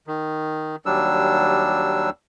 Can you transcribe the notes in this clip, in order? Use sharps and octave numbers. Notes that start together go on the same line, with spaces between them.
D#3
D#2 F#3 G3 D4 E6